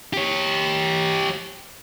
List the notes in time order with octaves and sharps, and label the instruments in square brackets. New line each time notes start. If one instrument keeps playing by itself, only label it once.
[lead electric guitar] G4 C#5